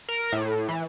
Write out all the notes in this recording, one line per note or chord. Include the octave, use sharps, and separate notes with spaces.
A#4
A2
E3